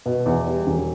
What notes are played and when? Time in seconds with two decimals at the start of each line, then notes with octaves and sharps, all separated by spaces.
0.06 B2
0.26 E2
0.46 G3
0.67 E1